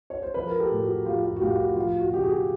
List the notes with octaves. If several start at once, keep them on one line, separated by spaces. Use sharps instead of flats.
C#5
C5
F3 B4
A#4
G4 A4
A2
F#4
F3 F4 G4
F4 G4
F#4
A2 F4 G4
F4
F#4
F3 F4
F#4
C#3 G4
F#4 G#4